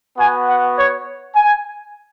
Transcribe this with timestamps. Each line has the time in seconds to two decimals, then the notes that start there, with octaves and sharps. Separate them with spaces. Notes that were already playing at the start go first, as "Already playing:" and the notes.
0.17 B3 F#4 G#5
0.47 F#5
0.78 C#5
1.36 G#5